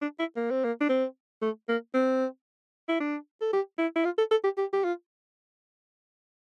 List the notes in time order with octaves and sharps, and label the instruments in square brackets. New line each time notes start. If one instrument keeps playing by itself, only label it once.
[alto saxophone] D4
E4
A#3
C4
A#3
D4
C4
A3
A#3
C4
E4
D4
A4
G4
E4
E4
F4
A4
A4
G4
G4
G4
F4